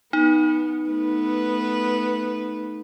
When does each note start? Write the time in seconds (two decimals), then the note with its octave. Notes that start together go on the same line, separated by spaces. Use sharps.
0.13 B3 D#4
0.89 A3 B3 B4